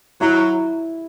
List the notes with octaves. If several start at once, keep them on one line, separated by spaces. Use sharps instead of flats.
F#3 E4